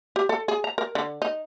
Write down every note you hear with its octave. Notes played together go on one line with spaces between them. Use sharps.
G4
A4
G#4
A#5
A#4
D3
D#4